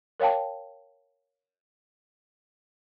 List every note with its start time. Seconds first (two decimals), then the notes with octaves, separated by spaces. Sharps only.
0.20 A#4 C#5 F5 G5 A5